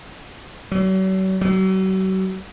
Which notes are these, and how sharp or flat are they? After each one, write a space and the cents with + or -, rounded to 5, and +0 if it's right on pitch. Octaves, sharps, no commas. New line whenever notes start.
F#3 +40
F#3 +40